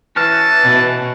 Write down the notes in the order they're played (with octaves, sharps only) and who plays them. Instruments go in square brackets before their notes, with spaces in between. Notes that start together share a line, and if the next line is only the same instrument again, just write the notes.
[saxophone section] E3 [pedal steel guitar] C#4 F#4 F6 [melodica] A5
[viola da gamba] B2